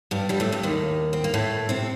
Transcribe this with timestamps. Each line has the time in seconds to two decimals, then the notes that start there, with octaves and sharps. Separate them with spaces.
0.11 G2 G3
0.29 G2 G3
0.40 A2 A3
0.52 G2 G3
0.63 D#2 D#3
1.13 C4
1.24 A#3
1.34 A2 A3
1.69 C3 C4